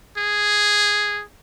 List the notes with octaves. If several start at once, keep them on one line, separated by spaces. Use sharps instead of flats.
G#4